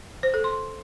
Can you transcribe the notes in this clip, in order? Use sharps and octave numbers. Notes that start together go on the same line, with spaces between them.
C5
A4
C6